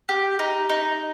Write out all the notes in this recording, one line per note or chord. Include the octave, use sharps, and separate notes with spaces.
G4
D#4
D#4